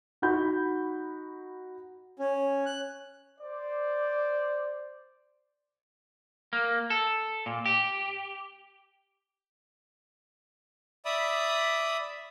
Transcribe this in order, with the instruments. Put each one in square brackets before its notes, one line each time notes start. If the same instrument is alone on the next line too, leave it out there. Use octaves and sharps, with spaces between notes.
[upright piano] D#4 F#4 B5 G6
[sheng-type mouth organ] C#4
F#6
[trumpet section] C5 D5
[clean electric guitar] A#3
A4
A#2
G4
[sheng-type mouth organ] D5 E5 B5 D#6